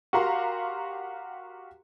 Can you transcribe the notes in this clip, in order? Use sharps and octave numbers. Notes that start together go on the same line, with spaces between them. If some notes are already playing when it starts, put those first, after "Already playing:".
F#4 G4 A#4 F5 A#5 C6